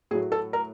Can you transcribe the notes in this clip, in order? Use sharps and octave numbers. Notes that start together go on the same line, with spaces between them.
A2 F#3 A3 G#4
A4
A#4